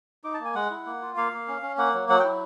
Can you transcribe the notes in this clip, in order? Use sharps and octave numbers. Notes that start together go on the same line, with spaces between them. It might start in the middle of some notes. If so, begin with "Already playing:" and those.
D#4 D6
A5
A#3
G#5
G#3 F#5
E4
A#3
F4
A#3 F5
A#3
C#4
C#4
A#3 F#5
F#3
F#3 F#5
G5
E4